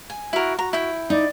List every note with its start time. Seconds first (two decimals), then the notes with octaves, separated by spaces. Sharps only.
0.10 G#5
0.33 E4 F#4 A#4
0.59 F#4 A#5
0.73 E4 G5
1.10 D#4 D5